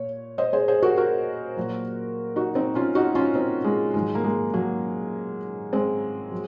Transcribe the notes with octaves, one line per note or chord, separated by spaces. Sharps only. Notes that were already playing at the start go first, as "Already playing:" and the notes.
Already playing: A#2 C#5
C5 D#5
G#4 C5
G#4 C5
F#4 A#4
F#4 A#4
A#2 F#3
D#4 F#4
C4 D#4
C#4 F4
D#4 F#4
C#4 F4
C4 D#4
G#3
G#2 D#3 F#3 G#3
A#3
G#3
F#3 A#3
G#3 C4
F#3